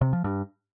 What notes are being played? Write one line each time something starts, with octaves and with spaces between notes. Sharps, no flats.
C3
F3
G2